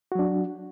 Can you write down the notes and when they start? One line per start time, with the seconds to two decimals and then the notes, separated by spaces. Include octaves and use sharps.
0.12 F#4
0.15 F#3
0.19 D4